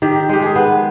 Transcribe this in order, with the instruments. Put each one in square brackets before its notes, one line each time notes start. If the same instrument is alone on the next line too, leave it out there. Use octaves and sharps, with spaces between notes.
[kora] D#3 [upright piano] G4
[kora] G#3 [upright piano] G4
[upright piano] G#4
[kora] B3